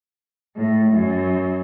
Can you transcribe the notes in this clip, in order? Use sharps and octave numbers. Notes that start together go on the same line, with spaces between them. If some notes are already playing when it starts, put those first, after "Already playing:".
A2
F#2